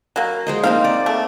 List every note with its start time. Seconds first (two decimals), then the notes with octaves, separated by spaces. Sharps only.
0.16 F#3 A#3
0.47 G#3 C5 D#5
0.64 A#3 C4 D#4 F5
0.84 D5
1.06 A3